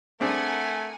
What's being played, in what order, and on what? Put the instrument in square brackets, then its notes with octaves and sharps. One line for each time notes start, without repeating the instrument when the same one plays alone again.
[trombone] A3 [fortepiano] C4 D4 G#4 [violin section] A#4 F#5 G#5